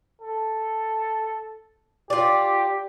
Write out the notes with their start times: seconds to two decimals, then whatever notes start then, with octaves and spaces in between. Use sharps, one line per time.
0.21 A4
2.10 F4 G4 D5